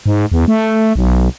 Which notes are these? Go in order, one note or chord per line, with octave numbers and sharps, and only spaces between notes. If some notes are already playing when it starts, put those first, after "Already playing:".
G#2
E2
A3
B1